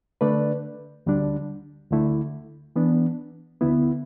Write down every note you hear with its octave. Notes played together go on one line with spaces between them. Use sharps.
D3 A3 D4 B4 D5
D2 D3 G3 D4
D2 D3 A3 E4
E3 B3 D4
D2 D3 B3 E4